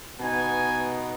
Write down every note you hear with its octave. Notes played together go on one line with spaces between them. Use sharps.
B2 B3 D#4 G#5